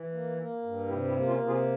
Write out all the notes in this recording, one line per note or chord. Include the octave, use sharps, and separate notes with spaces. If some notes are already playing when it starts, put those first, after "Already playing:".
Already playing: E3
A#3
A#3
G2
C3 E4 G4
E4 G4
A#3
C#4 F4
C3
F4 G#4